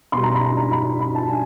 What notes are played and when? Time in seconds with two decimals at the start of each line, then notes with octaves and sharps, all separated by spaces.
0.12 B2 G3 C6
0.23 A#5
0.35 B5
0.46 A#5
0.57 A#5
0.72 B5
1.00 B5
1.15 A5
1.30 G#5